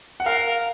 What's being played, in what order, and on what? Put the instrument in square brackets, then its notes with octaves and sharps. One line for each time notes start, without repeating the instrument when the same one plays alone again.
[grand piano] F#5
[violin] A#4 [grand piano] F5